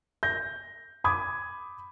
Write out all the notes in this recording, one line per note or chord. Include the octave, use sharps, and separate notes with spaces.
G6 A#6
B5 D6 D#6 G#6